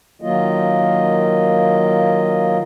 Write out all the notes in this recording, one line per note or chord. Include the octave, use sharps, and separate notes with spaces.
D#3 F#3 A#3 F4 D#5